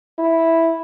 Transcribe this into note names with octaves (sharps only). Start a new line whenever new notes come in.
E4